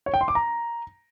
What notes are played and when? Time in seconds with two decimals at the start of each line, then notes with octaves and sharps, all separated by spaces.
0.06 C#5
0.14 G5
0.21 C6
0.28 D6
0.35 A#5